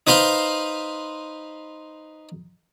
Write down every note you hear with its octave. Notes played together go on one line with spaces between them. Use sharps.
D#4 B4 C5 F5 C6